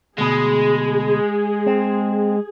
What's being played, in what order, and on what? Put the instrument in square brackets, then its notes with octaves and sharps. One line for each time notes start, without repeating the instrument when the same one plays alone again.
[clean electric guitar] D2 B2 [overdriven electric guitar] G#3 [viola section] G#4
[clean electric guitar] C4